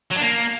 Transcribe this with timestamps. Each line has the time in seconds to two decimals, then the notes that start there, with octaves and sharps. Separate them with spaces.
0.11 F#3
0.16 D4
0.21 A#3